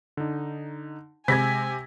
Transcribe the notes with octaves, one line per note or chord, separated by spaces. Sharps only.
D3 D#4
C3 G#3 G#5 G#6 A#6 B6